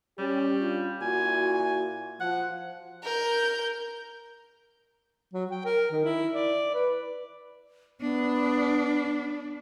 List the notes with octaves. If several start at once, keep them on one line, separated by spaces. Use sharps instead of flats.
G3 C#4 G4
D4 F4
A#2 E4 F#4 G#5
F3 F#5
A#4 G6
F#3
G5
A#4
D#3
E4
D5
B4
B3 D4